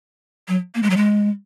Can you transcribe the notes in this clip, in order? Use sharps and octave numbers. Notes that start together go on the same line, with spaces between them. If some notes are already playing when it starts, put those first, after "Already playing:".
F#3
A#3
G#3
F#3
G#3